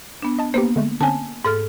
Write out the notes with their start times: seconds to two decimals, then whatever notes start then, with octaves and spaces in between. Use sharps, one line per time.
0.22 B3 D4
0.39 D#5 A5
0.54 A#3 B3 G4 B4 C5
0.76 D3 G#3 A3
1.01 D3 C4 C#4 G#5 A5
1.45 G#2 A4 F6